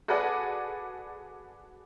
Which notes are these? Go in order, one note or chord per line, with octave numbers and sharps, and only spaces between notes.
F#4 G#4 A4 B4 D5 F#5